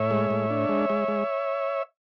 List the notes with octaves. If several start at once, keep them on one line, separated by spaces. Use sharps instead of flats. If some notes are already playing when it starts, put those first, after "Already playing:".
Already playing: A2 C#5 E5
G#3
A2
D4
G#3
G#3
G#3